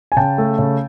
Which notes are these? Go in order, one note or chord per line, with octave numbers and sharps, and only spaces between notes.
G#5
C#3 G5 A5
A3
C#3